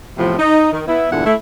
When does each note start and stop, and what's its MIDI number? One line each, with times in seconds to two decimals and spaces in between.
0.18 0.36 40
0.18 0.36 45
0.18 0.36 48
0.18 0.36 53
0.39 0.69 63
0.73 0.87 51
0.88 1.11 59
0.88 1.11 64
1.12 1.23 40
1.12 1.23 43
1.12 1.23 46
1.12 1.23 50
1.12 1.23 64
1.12 1.23 78
1.26 1.35 57
1.26 1.35 64